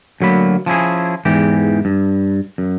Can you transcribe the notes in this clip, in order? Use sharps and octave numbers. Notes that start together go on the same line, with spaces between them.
D2 F#3 A#3 B5
F3 C#4 E4 G#4
E2 G#2 E3 G4
G2
F#2